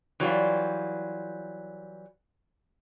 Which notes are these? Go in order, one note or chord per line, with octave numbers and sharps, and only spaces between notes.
E3 F#3 G3 F4